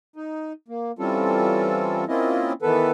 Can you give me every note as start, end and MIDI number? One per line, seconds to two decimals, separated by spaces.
0.16 0.53 63
0.68 0.92 58
0.99 2.04 52
0.99 2.04 55
0.99 2.04 60
0.99 2.04 61
0.99 2.04 65
0.99 2.04 69
2.08 2.53 58
2.08 2.53 60
2.08 2.53 61
2.08 2.53 64
2.08 2.53 65
2.08 2.53 75
2.62 2.92 51
2.62 2.92 52
2.62 2.92 59
2.62 2.92 69
2.62 2.92 71